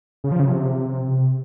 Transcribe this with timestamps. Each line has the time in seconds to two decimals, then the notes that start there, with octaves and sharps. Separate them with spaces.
0.24 C#3
0.32 F3
0.40 C#3
0.47 C3